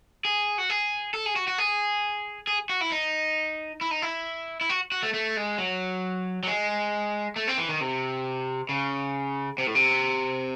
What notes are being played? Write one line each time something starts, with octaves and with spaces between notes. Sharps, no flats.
G#4
F#4
G#4
A4
G#4
F#4
F#4
G#4
G#4
F#4
E4
D#4
E4
D#4
E4
E4
F#4
F#4
A3
A3
G#3
F#3
F#3
G#3
A3
C4
E3
D#3
C3
C#3
C3
A2
C3